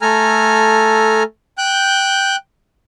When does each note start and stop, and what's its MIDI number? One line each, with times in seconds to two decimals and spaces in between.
0.01 1.23 57
0.01 1.23 69
0.01 1.23 80
0.01 1.23 82
0.01 1.23 89
1.58 2.36 79
1.58 2.36 90
1.58 2.36 91